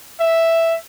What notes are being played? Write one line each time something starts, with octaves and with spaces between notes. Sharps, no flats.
E5